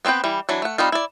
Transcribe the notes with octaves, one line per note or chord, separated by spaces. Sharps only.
B3 C4 D#4 B4 G5
E3 G3
E3 F#3 D4
A3 F#5
G3 C4 D#4 F4
E4 D5